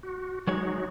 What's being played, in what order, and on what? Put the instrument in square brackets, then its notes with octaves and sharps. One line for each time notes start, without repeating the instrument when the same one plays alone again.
[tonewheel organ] F#4
[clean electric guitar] F#3 G#3 C#5 [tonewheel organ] D#4 F#4